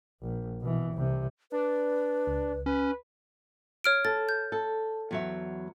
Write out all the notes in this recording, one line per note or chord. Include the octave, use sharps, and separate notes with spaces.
A#1
B2 E3
C2 C3
D4 B4
C#2
C#4 B4
C#5 F6 D7
A4 A6
G6
A4
E2 F#3 E5